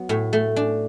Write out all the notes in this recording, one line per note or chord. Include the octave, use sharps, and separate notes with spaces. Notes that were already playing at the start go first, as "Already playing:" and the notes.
Already playing: F#3 B3
A2
A3
D4